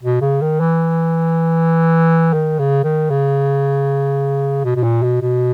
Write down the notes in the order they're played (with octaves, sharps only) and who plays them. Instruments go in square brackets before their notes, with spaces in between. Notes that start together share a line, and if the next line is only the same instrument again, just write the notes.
[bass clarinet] B2
C#3
D#3
E3
D#3
C#3
D#3
C#3
B2
B2
A#2
B2
B2